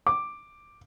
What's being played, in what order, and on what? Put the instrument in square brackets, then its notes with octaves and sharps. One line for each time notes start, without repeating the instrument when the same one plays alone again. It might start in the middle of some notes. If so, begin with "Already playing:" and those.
[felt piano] D6